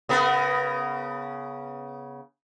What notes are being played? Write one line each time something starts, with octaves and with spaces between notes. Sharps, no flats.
C#3 B3 A#4